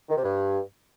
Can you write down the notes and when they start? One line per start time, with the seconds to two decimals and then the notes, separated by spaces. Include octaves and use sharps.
0.09 D#3
0.16 C3
0.24 G2